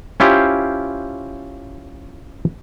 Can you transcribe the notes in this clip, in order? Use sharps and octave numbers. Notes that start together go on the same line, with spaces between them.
C#4 E4 F4 G4 C5